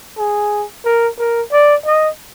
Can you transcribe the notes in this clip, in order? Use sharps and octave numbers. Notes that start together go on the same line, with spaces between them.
G#4
A#4
A#4
D5
D#5